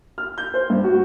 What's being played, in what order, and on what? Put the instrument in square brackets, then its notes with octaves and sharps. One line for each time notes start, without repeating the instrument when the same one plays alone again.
[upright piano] F6
G6
C5
G2
F#4